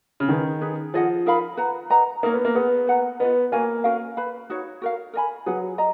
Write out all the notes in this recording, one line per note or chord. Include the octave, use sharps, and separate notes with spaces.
C#3
D#3 F4 G#4 B4
D#4 G#4 B4
F3 F4 G#4 D#5 F#5
D#4 A#4 F5 B5
B4 F#5 A#5
B4 D#5 F#5 A#5
A#3 D#4 A#4 C#5
B3
A#3
B3 G#4 B4 F#5
B4 F#5 A#5
B3 F4 B4 D#5
A#3 F#4 C#5 F5 G#5
C#4 F#4 A#4 F5
B4 F5 B5
D#4 F#4 C#5
F#4 A#4 F5
A#4 D#5 G#5 B5
F#3 G#4 B4 F#5
D#5 A#5